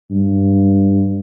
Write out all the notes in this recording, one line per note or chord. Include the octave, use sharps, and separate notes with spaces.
G2